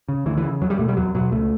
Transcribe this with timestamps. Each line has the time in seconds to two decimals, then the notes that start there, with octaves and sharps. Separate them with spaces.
0.08 C#3
0.26 D2 E3
0.38 E3
0.44 C#3
0.61 E2 F#3
0.70 G3
0.79 B2 A3
0.88 G3
0.97 E2 F#3
1.15 B2 F#3
1.32 C#2 A3